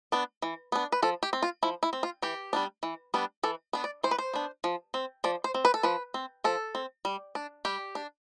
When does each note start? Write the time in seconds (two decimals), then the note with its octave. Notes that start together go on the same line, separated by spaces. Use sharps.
0.12 B3 D4
0.42 E3
0.72 B3 D4
0.92 B4
1.02 F3 A4
1.23 G4
1.33 C4
1.43 F4
1.63 F3 E4
1.83 E4
1.93 C4
2.03 F4
2.22 E3 G4
2.53 G3 B3 D4
2.83 E3
3.14 G3 B3 D4
3.43 E3 A4
3.73 B3 D4
3.84 D5
4.03 E3 C5
4.11 B4
4.19 C5
4.34 B3 D4
4.64 F3
4.94 C4
5.24 F3 D5
5.44 C5
5.54 C4
5.65 B4
5.74 A4
5.83 F3 B4
6.14 C4
6.44 F3 A4
6.75 C4
7.05 G3
7.35 D4
7.65 G3 G4
7.95 D4